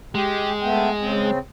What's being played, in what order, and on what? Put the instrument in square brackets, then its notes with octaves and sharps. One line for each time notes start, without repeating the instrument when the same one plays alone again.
[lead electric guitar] G#3 [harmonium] G4
[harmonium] A3 B3 G5
C#3 C4